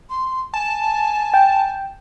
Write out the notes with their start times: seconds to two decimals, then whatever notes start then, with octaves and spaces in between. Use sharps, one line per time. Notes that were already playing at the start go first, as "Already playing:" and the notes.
0.10 C6
0.54 G#5 A5
1.34 G5